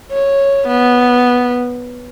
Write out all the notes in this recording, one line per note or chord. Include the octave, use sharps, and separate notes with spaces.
C#5
B3